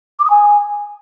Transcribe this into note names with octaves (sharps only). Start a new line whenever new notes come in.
D6
D#6
G#5